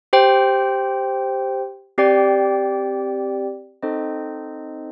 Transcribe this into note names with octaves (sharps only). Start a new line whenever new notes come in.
G4 C5 G5
C4 G4 D5 G5
C4 D#4 A4 C5 D#5